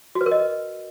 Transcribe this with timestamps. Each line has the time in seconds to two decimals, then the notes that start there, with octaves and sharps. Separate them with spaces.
0.15 F#4
0.21 B4
0.26 A#4
0.31 D#5